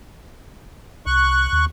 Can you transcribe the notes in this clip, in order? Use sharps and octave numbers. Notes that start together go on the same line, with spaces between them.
C2 C#6 F#6
D#2